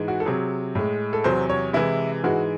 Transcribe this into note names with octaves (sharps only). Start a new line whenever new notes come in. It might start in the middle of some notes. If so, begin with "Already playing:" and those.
Already playing: G#2 E3 G#3
F#4
A4
C3 F#3 G#4
A2 G#3
A4
E2 C3 F#3 C5
C#5
C3 E3 G#3 E4
G#2 E3 G#3 F#4